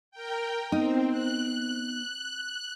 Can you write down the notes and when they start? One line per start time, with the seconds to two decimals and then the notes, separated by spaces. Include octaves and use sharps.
0.11 A#4 G5
0.72 B3 C4 D#4
1.10 F#6